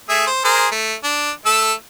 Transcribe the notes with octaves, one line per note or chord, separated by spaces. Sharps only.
A3 G#4 E5
C5
G#4 A#4 C5
A3
D4
A3 A4 E6